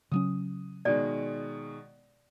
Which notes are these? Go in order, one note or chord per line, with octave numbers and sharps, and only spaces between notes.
C#3 F#3 C#4 D#6
B2 D#3 G#3 D5